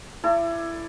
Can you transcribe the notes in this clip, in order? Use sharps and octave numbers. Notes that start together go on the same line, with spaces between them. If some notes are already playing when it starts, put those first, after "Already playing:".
E4 A4 D5